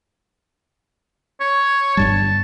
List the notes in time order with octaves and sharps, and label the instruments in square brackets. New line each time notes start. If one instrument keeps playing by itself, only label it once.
[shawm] C#5
[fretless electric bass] G1 G2 G3 [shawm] A5